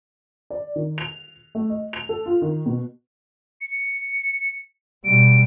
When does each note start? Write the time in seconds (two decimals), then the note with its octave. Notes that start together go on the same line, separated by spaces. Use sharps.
0.50 D5
0.76 D#3
0.98 F7
1.55 A3
1.69 D#5
1.93 F7
2.09 A4
2.26 F4
2.42 D#3
2.66 B2
3.61 C#7
5.05 B2 G3 D7